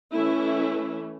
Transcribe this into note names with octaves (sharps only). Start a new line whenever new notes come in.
E3 A3 C#4 E4